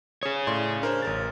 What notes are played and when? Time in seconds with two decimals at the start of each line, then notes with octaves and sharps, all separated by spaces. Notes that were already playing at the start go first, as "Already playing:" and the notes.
0.23 G#4 C#5 D#6
0.47 A2 D5 C6
0.81 D4 A#4 C5
1.02 A1 A#4 A6